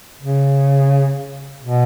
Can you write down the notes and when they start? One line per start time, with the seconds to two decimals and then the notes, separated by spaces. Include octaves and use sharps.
0.21 C#3
1.62 B2